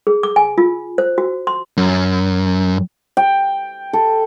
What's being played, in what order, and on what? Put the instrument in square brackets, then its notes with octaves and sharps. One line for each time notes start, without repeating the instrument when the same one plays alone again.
[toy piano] G#4
D6
G#5
F4
C5
F#4
C6
[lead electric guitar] F#2
[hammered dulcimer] G5
A4